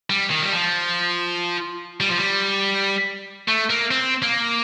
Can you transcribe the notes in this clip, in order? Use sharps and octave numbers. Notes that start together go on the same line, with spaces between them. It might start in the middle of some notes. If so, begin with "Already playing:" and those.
G3
D#3
G3
F3
G3
F3
G3
A3
A#3
C4
A#3